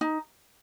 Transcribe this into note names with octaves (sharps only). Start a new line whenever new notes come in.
D#4